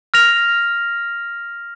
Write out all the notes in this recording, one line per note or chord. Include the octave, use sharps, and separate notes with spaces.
F6 A#6 F7